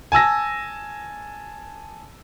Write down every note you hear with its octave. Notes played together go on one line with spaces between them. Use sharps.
G#5 A5 E6 A#6